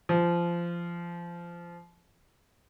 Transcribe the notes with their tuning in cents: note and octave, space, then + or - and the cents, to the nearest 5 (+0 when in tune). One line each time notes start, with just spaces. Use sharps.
F3 -20